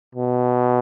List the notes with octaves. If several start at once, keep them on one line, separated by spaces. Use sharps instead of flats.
B2